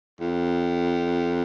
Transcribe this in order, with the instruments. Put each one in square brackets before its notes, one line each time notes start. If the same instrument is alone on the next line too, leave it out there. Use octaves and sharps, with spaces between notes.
[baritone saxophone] F2